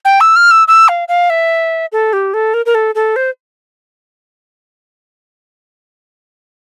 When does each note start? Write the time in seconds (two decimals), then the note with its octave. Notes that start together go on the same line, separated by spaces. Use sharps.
0.05 G5
0.21 E6
0.36 F6
0.51 E6
0.68 E6
0.88 F5
1.08 F5
1.30 E5
1.92 A4
2.13 G4
2.34 A4
2.54 A#4
2.66 A#4
2.75 A4
2.95 A4
3.16 C5